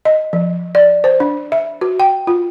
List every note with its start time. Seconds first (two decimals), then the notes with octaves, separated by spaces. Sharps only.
0.05 D#5
0.33 F3
0.75 D5
1.04 C5
1.20 D4
1.52 E5
1.81 F#4
2.00 G5
2.27 F4